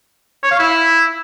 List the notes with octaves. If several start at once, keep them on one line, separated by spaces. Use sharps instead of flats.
C#5
F5
E4